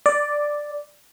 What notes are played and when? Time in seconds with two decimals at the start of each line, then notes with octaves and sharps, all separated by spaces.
0.06 D5